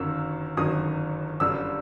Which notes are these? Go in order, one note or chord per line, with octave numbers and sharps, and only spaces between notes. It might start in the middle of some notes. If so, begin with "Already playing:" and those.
Already playing: G1 F#2 D#3 F#3 E6
G1 F#2 D#3 F#3 D#6
G1 F#2 D3 G3 E6